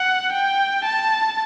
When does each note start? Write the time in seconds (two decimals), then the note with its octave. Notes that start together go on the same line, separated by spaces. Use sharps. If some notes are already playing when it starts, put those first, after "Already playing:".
Already playing: F#5
0.33 G5
0.85 A5